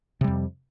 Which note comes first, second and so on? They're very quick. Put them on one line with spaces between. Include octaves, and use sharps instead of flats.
C3 G3 F2